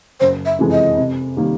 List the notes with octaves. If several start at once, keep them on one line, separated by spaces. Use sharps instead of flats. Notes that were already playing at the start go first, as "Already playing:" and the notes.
F#1 C5
E5
F2 C3 E3 G#3
D#5
C3
D#3 G3 A#3